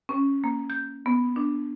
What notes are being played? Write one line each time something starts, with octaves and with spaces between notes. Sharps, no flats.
C#4
A#3
G6
B3
D4